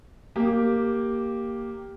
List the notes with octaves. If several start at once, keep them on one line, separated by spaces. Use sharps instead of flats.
A#3 G4